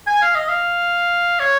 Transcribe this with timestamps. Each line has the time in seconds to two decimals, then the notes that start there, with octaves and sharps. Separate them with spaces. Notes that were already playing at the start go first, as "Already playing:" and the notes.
0.07 G#5
0.22 F5
0.35 D#5
0.49 F5
1.40 C#5